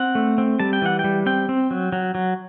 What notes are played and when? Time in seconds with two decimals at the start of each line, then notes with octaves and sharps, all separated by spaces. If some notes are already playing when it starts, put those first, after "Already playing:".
Already playing: C4 F#5
0.15 A3
0.38 C4
0.60 G3 A5
0.73 G5
0.82 E3 F#5
0.99 G5
1.04 G3
1.26 C4 G5
1.49 C4
1.71 F#3
1.92 F#3
2.15 F#3